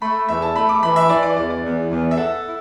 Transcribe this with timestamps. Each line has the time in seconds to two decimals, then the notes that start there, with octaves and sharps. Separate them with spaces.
0.02 A3 B5
0.29 E2 E5
0.42 A5
0.56 A3 B5
0.69 D6
0.82 E3 B5
0.96 E5
1.09 E3 D5
1.23 D5
1.36 E2 D5
1.50 D5
1.63 E2
1.90 E2
2.11 E5
2.17 A4 F#5
2.44 E4